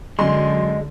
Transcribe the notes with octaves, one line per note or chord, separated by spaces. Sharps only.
F#2 D3 G#3 C6